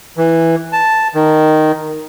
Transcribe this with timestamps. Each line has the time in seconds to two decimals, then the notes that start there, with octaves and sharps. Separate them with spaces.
0.17 E3
0.73 A5
1.15 D#3